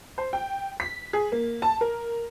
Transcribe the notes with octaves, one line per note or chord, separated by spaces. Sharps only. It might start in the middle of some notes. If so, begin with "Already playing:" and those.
C5
G5
B6
G#4
A#3
A5
A#4